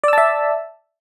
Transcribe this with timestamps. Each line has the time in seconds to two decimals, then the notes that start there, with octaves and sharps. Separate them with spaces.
0.04 D5
0.08 E6
0.13 A5
0.18 E5